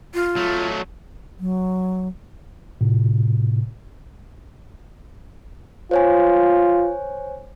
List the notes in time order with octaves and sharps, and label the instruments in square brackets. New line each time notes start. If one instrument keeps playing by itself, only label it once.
[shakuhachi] F4
[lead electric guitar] F#3 A3
[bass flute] F#3
[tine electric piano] A2 C3
[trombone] F4 [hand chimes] C5 C#5 G#5